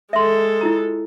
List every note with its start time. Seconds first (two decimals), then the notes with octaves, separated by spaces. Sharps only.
0.13 G#3 A4 E5 C6
0.61 E4 F4 A#5